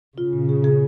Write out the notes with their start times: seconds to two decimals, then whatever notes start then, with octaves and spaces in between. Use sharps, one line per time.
0.18 C#3 F4
0.33 A#2
0.49 G#4
0.64 G#4